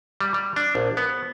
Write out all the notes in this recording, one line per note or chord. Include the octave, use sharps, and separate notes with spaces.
G3
G3
D4
A#1
B3